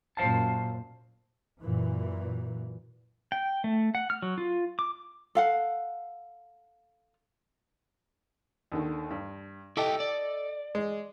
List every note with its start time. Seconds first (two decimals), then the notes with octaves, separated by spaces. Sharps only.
0.17 F#2 A#2 C5 F5 A5
1.61 F#2 A#2 E3
3.32 G5
3.64 A3
3.95 F#5
4.10 F6
4.22 F#3
4.38 F4
4.79 D6
5.35 A4 F5 F#5
8.72 D#2 D3 D#3
9.11 G2
9.77 E4 G4 A4 D#5 G5 D6
10.00 D5
10.75 G#3